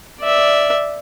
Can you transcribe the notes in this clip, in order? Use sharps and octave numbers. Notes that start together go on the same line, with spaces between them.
D5 E5